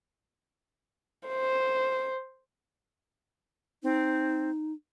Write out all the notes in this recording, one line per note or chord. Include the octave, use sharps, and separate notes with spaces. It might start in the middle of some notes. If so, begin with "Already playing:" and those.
C5
C4 D#4